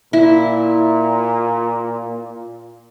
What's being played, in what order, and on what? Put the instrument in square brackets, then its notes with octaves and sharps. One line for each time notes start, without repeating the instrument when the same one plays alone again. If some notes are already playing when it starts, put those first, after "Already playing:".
[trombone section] A#2 [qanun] E4